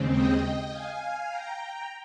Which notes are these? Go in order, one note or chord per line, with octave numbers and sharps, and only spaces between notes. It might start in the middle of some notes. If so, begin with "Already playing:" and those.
Already playing: D#2 C#3 G#3 C4
D#5 G5
F5 G#5
G5 A#5